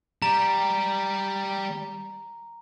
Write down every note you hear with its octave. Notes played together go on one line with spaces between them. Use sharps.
G3 G4 A#5